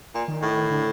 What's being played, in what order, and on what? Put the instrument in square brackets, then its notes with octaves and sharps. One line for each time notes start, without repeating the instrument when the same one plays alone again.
[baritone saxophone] A#2
[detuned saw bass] D#3
[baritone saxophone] A2
[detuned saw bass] D3